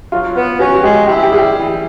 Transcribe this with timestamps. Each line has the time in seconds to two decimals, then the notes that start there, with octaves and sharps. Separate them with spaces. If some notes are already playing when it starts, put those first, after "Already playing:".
0.12 F#3 F4
0.36 B3
0.59 C#4 F#4
0.75 F#4
0.83 G#3 G4
1.07 E4 G4
1.23 G4
1.31 G3 G#4
1.39 G4
1.55 E3